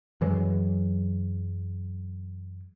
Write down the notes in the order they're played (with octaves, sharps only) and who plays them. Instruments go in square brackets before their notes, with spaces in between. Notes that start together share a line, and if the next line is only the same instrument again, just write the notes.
[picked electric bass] F#2 E3 F#3 G#3